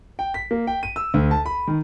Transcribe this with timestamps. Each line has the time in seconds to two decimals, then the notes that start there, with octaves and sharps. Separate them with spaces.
0.19 G5
0.34 B6
0.51 A#3
0.67 G5
0.83 D#7
0.96 E6
1.14 D2
1.31 A5
1.46 B5
1.67 D#3